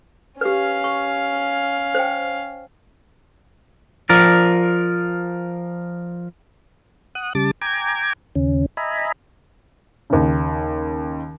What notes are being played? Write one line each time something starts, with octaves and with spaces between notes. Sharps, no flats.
C#4 G4 B4 F5
C#6
C5 G5
F3 A#4 D5
F#5 D#6 F#6
C#3 G3 A5 D6 A6
G5 G#5 A#5 D6 G#6
D#2 C#3 C#4
D#5 E5 G#5 A#5 B5
D#2 C#3